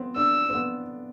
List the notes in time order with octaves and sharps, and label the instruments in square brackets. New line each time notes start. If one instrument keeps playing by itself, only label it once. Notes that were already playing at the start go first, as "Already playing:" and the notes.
Already playing: [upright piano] B3 C4
[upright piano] D4 [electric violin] E6
[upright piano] C4
B3